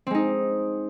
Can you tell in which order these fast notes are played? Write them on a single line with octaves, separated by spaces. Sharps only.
C4 G#3 D#4